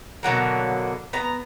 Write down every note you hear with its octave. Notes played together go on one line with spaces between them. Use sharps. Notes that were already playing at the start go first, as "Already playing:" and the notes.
B2 D3 F#3 A#3
B3 A#5